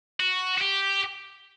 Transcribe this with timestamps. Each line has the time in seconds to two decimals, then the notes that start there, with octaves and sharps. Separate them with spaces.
0.20 F#4
0.58 F#4
0.61 G4